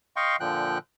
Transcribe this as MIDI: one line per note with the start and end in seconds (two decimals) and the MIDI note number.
0.16 0.36 75
0.16 0.36 77
0.16 0.36 79
0.16 0.36 84
0.16 0.36 85
0.40 0.78 46
0.40 0.78 50
0.40 0.78 53
0.40 0.78 79
0.40 0.78 90